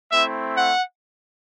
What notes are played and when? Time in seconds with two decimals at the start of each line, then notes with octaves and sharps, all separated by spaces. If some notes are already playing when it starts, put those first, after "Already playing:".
0.12 A3 C4 E4 E5
0.55 F#5